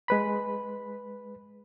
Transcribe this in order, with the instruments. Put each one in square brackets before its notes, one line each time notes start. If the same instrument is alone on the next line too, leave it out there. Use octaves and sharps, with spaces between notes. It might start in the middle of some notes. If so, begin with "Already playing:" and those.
[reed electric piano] G#3 B4 B5